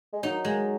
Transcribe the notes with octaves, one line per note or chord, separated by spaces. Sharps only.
G#3
F#3 D#4
G#3